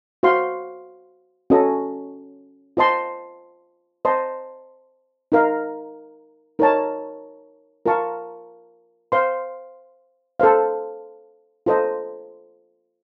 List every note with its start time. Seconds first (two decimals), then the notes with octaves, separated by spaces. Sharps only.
0.23 F#4 C5 F5 C6
1.50 C#4 F#4 A4 D#5
2.77 F4 C5 D#5 A5 C6
4.05 C5 D#5 A5 C6
5.32 D#4 A#4 F5
6.59 D#4 A#4 C#5 A5
7.86 F4 A#4 F5 A5 C#6
9.12 C5 F5 C6
10.40 A4 C5 F5
11.66 F4 A4 C5 D#5